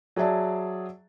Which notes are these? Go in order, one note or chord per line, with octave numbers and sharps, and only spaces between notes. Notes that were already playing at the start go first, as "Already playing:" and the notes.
F#3 G#4 D5 E5 A5